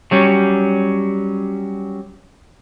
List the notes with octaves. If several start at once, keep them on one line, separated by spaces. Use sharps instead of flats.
F#3 G3 C#4